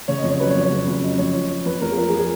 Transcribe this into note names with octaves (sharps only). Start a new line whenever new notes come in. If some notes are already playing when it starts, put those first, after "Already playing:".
C#3 C#5
D#5
F2
C#5
F#3 B4
C#5
F2
C#5
C#3
F2
F#3 D#5
F2 C#5
F3
F3
F2 B4
F2 A#4
G#4
F3 A#4
G#4
F3
G#4